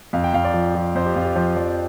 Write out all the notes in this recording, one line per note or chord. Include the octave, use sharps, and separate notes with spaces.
F2 F5
G5
F2 F5
D5
F3
F3
F2 C5
G4
F2 F4
G4
F3 C5
F3 D5